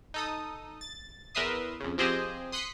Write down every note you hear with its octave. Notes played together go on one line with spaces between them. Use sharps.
D#4 A4 D#6
A6
E2 A#4 B4 E5 C6 D#6
F2 C#3
F3 C4 G4 G#4 C5 D#5
C6 D#6 F#6 B6 C#7